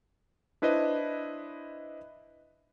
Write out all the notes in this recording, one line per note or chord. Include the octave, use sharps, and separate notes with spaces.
D4 E4 B4 C5 D#5